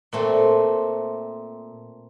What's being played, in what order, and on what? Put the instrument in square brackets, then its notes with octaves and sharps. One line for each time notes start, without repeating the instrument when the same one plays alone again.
[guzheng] A#2 A3 C4